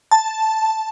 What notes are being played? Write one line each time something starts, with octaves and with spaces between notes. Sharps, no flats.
A5